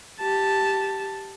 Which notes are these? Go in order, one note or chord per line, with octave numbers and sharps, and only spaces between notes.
G4 A5